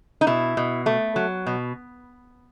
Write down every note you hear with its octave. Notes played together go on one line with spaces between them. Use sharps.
D#4
B2 E4
B2
A3
F#3
B2